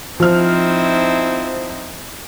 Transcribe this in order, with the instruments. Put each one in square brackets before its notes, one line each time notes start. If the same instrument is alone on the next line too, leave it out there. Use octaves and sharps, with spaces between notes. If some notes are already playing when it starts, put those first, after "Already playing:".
[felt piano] F3 F6 [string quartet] C4 D#4 E4